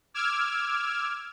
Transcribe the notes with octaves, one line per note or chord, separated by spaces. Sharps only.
D6 E6 F6 G#6